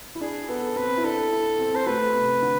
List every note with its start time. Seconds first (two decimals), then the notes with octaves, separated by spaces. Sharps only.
0.15 E4
0.21 D4 G#4
0.49 B3 A4
0.76 C4 B4
0.98 E4
1.04 D4 A4
1.32 E4
1.59 C4
1.75 C5
1.86 A3 B4
2.14 C3
2.42 D3